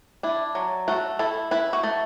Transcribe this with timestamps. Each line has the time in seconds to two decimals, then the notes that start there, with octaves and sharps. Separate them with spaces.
0.23 D4 E4
0.55 F#3
0.88 A3 F#4
1.19 E4 A4
1.51 E4 B4
1.73 F#4
1.83 A3